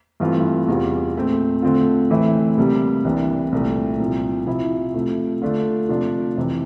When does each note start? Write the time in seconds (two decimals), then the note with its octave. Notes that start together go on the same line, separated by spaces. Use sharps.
0.20 G2 E3 A3 C4 F4
0.68 E2 C3 G3 C4 F4
1.16 A#2 A3 C4
1.62 D3 A3 C4 F4
2.10 A2 E3 A3 C4 E4
2.58 D2 C3 G3 A#3
3.05 C2 C3 E3 A#3 D4
3.52 C2 A#2 F3 A3
4.00 C2 A#2 F3
4.47 C3 F3 C4 E4
4.94 C3 F3 A3
5.42 D3 A3 D4 F4
5.89 C3 F3 A3 D4 F4
6.37 F2 C3 E3